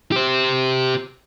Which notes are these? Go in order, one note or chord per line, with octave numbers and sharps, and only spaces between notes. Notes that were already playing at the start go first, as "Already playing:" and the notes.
G4 C5